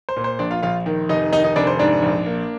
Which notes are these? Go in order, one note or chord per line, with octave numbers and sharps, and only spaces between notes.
C5
A#2
C5
A#1 D4 D5
F4 F5
A#1 F4 F5
D#3
F1 D#4 D#5
D#3 D#4 D#5
D#4 D#5
F1 D4 D5
C5
G#2 D4 D5
A#1
A#3